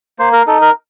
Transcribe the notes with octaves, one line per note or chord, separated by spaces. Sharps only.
A#3 C5
A#4
D#4 A4
A#4